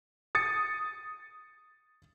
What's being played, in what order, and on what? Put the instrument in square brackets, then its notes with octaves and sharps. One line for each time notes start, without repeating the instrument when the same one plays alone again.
[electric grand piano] D#6 A6 C#7